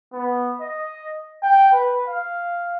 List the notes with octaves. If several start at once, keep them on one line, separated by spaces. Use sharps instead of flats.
B3
D#5
G5
B4
F5